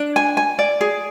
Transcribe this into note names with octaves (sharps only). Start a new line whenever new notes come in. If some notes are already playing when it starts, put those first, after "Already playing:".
Already playing: D4
G#5
G#5
D5
G#4